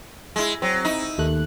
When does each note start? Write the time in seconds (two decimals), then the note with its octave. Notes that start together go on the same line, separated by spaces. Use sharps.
0.36 G#3 E4
0.62 F#3 C4
0.85 D#4 E4
1.18 D#2 A3 F#6